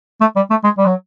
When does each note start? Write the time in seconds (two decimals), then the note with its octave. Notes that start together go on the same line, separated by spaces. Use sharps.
0.21 A3
0.36 G3
0.50 A3
0.64 G#3
0.78 G3
0.86 F#3